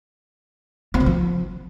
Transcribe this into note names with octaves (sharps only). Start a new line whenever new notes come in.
C4
D#3
F3